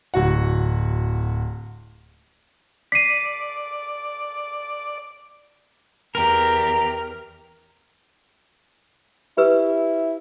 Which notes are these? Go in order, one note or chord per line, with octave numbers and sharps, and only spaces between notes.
D1 F#4 F#5
D5 B6 C7 D#7
E2 G4 A#4 A#5
E4 G4 B4 E6